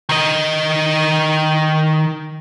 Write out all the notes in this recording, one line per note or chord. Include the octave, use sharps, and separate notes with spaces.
D#3 D#5